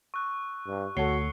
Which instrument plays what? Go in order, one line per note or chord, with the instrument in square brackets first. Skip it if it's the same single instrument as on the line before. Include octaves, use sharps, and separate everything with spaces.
[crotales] C#6 E6 F#6
[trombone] G2
[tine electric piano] D2 [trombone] F#4 [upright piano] A4 C#5 [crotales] C7 C#7 G7